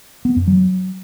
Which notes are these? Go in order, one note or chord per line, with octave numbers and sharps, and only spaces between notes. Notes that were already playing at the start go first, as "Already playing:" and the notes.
B3
F#2
F#3